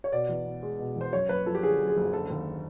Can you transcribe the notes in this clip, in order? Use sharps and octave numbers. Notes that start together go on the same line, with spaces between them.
C#5
B2 D5
E2
B3
G#3
B2
E2 C5
F#2 C#5
F#1 B4
F3 A4
G4
D3 G#4
F#2
G#4
F#1
D3 A4
D#2